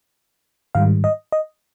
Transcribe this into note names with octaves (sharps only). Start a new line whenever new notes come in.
G#2 D#3 G3 F5
D#5
D#5